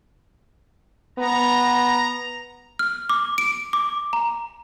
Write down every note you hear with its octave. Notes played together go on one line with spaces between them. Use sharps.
B3 A#5
F6
D6
D7
D6
A#5